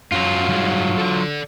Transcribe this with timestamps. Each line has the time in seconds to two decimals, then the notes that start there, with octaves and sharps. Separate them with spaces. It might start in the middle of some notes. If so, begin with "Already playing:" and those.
0.12 F#2 F#3 F4
0.49 G2 G#3
0.98 A4 D5